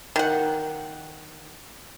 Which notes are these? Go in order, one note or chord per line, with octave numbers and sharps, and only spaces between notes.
D#3 F#5